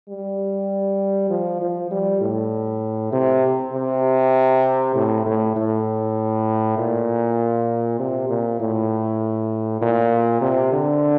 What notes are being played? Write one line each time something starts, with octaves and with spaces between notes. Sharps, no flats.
G3
F3
F3
G3
A2
C3
C3
A2
A2
A2
A#2
C3
A#2
A2
A#2
C3
D3